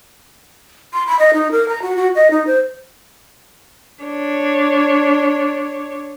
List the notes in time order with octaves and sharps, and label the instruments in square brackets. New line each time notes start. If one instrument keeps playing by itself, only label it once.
[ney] C6
B5
D#5
D#4
A#4
A#5
F#4
F#4
D#5
D#4
C5
[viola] D4 C#5